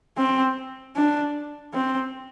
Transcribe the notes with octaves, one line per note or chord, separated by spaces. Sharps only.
C4
D4
C4